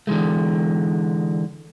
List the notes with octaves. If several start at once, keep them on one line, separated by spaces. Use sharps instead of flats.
D3 E3 G#3 A3